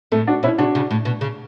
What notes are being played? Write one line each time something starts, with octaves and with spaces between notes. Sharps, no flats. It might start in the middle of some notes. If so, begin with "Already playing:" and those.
A2 A3
D4 F#4
B2 C#4 E4
C#3 D4 F#4
C#3
A2
B2
C#3